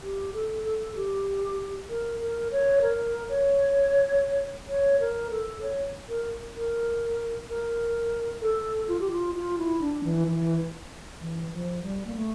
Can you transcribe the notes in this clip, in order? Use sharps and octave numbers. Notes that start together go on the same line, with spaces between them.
G4
A4
A4
G4
A#4
A#4
C#5
A#4
C#5
C#5
A#4
A4
C#5
A#4
A#4
A#4
A4
F4
G4
F4
F4
E4
D4
E3
E3
E3
E3
F3
G3
A#3
A3